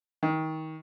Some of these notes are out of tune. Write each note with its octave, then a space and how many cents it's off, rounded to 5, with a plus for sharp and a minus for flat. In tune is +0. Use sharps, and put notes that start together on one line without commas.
D#3 +25